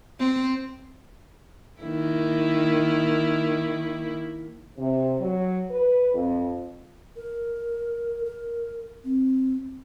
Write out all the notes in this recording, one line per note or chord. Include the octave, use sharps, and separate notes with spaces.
C4
D#3 A#3 E4
C3
F#3
B4
F2
A#4
A#4
C4